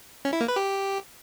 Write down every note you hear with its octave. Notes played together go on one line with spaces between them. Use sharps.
C#4
E4
A#3
B4
G4